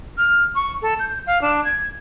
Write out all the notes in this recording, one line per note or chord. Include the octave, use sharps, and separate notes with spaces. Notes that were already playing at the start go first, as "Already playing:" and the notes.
F6
C#6
A4
G6
F5
D4
G#6